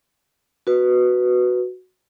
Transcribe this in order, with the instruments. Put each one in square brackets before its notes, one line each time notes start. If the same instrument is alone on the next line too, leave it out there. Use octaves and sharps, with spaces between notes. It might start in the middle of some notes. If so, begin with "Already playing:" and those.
[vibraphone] F#4 B4